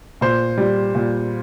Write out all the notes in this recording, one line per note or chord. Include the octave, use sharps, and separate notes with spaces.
A#2 C5
G3
A#2